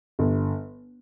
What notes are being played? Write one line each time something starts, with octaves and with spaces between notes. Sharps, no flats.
G1